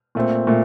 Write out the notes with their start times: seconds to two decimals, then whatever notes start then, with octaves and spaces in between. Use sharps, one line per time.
0.15 A#2 A3 C4
0.47 A#2 A3